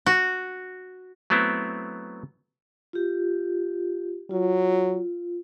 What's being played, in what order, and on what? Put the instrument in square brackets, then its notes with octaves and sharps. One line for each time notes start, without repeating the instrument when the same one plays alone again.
[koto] F#4
[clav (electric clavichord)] F#3 A3 B3 C4 E4
[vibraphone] F4 G4
[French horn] F#3 [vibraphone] F4